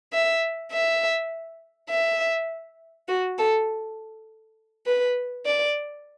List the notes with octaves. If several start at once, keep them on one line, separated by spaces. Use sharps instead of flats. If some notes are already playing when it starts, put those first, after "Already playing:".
E5
E5
E5
F#4
A4
B4
D5